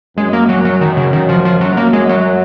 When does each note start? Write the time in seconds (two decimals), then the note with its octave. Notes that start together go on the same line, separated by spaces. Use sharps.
0.17 F#2 G#3
0.33 A#3
0.49 F#3
0.65 F#3
0.81 D#3
0.97 C#3
1.13 F#2 D#3
1.29 F3
1.45 F3
1.61 F#2 F#3
1.77 A#3
1.93 G#3
2.09 F#3